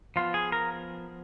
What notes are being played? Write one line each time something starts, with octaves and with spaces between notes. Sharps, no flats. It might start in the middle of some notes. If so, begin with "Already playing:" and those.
F3 B3 F4
G#4
A#4